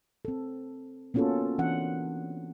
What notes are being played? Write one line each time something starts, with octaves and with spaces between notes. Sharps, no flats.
C4 A4
A#3 B3 C#4 F4 F#4 A4
E3 C4 D4 F#5